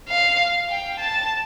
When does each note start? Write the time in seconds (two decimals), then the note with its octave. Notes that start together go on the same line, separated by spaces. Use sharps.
0.09 F5
0.69 G5
0.99 A5